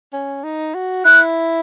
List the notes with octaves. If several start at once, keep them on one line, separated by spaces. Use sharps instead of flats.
C#4
D#4
F#4
E4 F#6